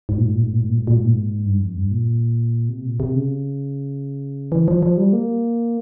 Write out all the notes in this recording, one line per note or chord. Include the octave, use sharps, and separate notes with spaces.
G#2
A#2
G#2
A#2
G#2
A#2
G#2
A#2
G#2
A#2
G#2
A#2
G#2
G2
F2
G2
A#2
C3
A#2
C3
C#3
E3
F3
F3
G3
A#3